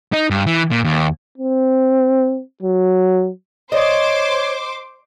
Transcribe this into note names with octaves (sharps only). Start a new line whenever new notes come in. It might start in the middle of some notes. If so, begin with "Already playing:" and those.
D#4
G2
E3
A#2
D#2
C4
F#3
C5 C#5 D#5 C6 D6